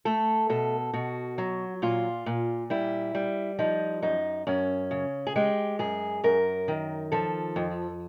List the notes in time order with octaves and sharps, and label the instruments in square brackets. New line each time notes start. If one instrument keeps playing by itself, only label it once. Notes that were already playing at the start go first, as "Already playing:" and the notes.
[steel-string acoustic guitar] A3 A4
B2 A4
B2 F#4
F#3
A#2 F4
A#2
G3 E4
G3
F3 D#4
F#2 D#4
F#2 C#4
C#3
G#4
G#3 G4
F#2 G#4
F#2 A#4
D#3
F3 A4
F2